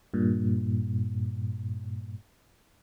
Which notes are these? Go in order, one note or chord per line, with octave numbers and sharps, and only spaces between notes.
G2 A#2